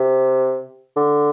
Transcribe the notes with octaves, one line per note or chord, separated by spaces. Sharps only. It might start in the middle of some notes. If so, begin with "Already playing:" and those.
Already playing: C3
D3